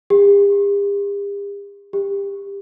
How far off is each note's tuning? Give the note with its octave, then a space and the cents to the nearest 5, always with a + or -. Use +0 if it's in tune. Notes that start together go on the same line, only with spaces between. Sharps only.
G4 +45
G4 +25